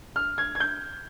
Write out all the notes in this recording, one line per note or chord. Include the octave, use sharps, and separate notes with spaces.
F6
G#6
G#6
G6